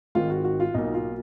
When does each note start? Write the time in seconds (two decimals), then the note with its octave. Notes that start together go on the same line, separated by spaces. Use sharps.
0.15 G#1 G#2 D#3 F4
0.30 F#4
0.44 F#4
0.60 F4
0.74 B1 B2 A#3 D#4
0.94 F4